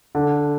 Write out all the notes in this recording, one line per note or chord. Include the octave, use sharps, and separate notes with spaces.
D3